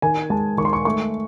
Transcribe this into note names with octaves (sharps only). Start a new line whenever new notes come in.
D#3 G#5
G#3 A5
D#3 C#6
C6
C#6
A3 C#6